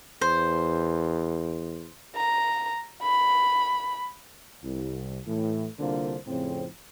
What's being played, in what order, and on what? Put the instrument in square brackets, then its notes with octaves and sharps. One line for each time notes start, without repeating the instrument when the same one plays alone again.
[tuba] E2 [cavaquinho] C5
[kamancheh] A#5
B5
[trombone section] C2
A2 E3 A3
C2 D3 A#3 D4 F4 C5
F2 A2 C#3 C4